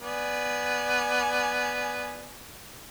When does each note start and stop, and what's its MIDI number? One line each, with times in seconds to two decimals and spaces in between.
0.02 2.32 59
0.02 2.32 74
0.02 2.32 80